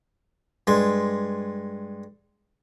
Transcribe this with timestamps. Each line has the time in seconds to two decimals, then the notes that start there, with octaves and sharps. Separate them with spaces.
0.67 G2 G#3 C6